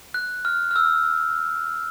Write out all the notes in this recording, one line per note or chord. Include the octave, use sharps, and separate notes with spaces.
F#6
F6
F6
E6